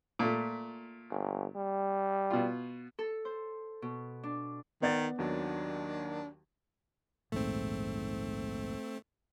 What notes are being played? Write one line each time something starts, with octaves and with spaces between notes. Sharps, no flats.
A#2 A3
G1
G3
B2 F4
A4
C5
B2
D4
D#3 B3 D5 A6
D#2 D#3 F#3 D4
A#1 D#2 G#2 A3 C4